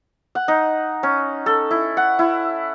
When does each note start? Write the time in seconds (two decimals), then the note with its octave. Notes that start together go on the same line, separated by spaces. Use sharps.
0.35 F#5
0.48 D#4
1.03 C#4
1.46 A4
1.71 E4
1.97 F#5
2.19 E4